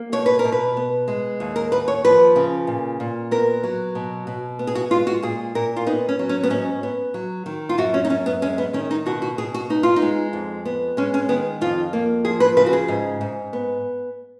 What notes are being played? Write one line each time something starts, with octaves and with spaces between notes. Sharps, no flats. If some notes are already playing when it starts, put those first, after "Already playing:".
Already playing: A#3
B2 C#5
B4
A#4
B2
B4
B3
G#3
D#2
A#4
D#2 B4
C#5
F3 B4
C#3
A#2
A#2
B3 A#4
F#3
B2
B2
B3
G#4
F#4
G#3 F4
F#4
A#2 G#4
A#2 A#4
F4
B3 D#4
C#4
F#3
C#4
B3
G#2 C#4
B3
F#3
D#3
F4
F#2 F#4
C#4
D#4
F#2 C#4
B3
G#3 C#4
B3
D#3 C#4
D#4
B2 F#4
F#4
B2 G#4
F#4
B3 D#4
F4
D#4
G#3
F2
B3
G#3 C#4
C#4
D#3 B3
F2 F4
A#3
F3 G#4
B4
C#3 B4
F#4
G#4
G#2
G#2
B3